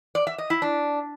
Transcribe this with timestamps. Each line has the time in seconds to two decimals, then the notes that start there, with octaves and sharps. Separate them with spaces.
0.15 D5
0.27 E5
0.38 D#5
0.50 E4
0.62 D4